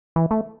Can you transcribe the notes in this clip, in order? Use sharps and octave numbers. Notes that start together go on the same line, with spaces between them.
E3
A3